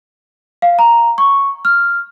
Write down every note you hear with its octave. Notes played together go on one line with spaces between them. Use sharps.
F5
A#5
C#6
F6